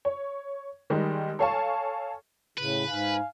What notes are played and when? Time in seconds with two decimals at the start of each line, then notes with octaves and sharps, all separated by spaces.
0.05 C#5
0.90 D#3 G3 G#3 D#4
1.39 A4 C#5 F5 G#5 A5 C#6
2.58 A2 C#3 B4
2.88 G#2 F5 G#5